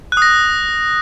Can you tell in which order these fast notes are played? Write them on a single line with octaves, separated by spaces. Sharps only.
F#6 D#6 A#6